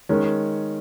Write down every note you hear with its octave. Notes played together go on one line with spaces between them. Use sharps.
D#3 G#3 C#4